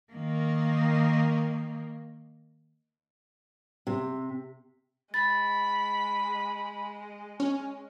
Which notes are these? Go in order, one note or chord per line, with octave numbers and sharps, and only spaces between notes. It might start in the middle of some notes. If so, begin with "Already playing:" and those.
D#3 A#3
C3
G#3 B5 A6
C#4